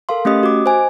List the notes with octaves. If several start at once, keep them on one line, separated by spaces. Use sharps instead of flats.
A4 A#4 F5 C6
A3 C#4 G4 D#5 D#6
F#4 D6
C5 D#5 G#5